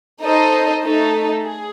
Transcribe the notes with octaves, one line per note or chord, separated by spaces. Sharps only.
D#4 A4 C5 D#5
A3 D#4 A4
G#4